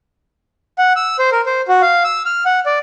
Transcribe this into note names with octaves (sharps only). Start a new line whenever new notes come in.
F#5
E6
C5
A#4
C5
F#4
F5
E6
F6
F#5
D5